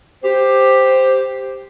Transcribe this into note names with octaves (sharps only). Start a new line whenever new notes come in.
G4 C5